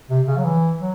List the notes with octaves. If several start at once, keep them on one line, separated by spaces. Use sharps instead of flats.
C3
C#3
F#3
E3
F#3